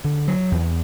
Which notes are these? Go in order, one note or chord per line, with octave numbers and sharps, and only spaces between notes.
D3
F#3
E2